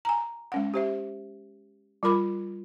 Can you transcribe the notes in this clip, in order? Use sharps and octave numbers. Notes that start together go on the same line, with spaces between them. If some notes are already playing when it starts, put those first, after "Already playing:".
G#5 A#5
G#3 C#4 F#5
G4 C5 E5
G3 F4 A#4 B5 D6